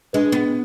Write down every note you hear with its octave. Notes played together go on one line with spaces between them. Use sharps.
G#3 D4 G#4 B4
B3